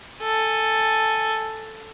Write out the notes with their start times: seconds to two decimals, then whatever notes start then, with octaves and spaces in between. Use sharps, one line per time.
0.23 A4 G#5